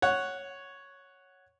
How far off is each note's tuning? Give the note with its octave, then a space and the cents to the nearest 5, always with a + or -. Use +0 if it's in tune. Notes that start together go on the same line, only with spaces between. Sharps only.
C#5 +0 F#5 +0